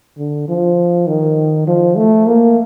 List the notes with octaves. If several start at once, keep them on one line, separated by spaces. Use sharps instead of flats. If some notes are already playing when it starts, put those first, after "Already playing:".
D3
F3
D#3
F3
A3
A#3